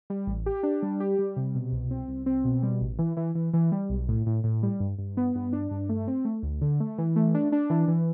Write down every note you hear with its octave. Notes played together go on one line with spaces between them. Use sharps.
G3
A1
G4
D4
G3
G4
G3
C3
B2
C2
C4
C2
C4
B2
G3
A1
E3
E3
E3
E3
G3
B1
A2
A2
A2
G3
G2
G2
B3
G2
D4
G2
A3
C4
A3
D2
D3
A3
E3
A3
D4
D4
E3
E3